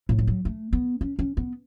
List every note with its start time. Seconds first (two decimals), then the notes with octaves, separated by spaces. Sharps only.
0.09 A2
0.19 G3
0.27 F#3
0.45 A3
0.73 B3
1.01 C#4
1.19 C#4
1.37 B3